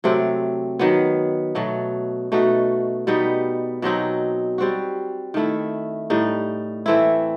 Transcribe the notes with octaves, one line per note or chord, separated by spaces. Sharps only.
C3 F#3 A3 C4
D#3 F#3 B3
B2 F#3 A3
B2 A3 D#4 F#4
B2 G3 B3 D#4
B2 F#3 C4 D#4
G3 C4 F#4
D#3 A3 E4
A2 G3 D#4
E3 A3 C4 E4